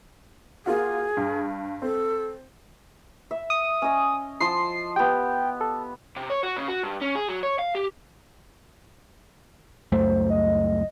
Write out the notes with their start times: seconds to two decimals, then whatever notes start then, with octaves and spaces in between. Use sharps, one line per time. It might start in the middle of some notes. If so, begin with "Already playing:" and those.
0.66 A#3 F4 F#4 G#4
1.17 G2
1.82 C4 A4
3.31 E5
3.50 D#6
3.82 C#4 D#5
4.40 F3 C6 D#6 C7
4.96 B3 G4 G5
5.61 A4
6.17 C3
6.30 C#5
6.43 F#4
6.57 C#3
6.68 F#4
6.83 G2
7.02 C#4
7.15 G#4
7.29 F#3
7.43 C#5
7.59 F5
7.75 G4
9.92 C#2 F#2 A3 C5
10.30 D#5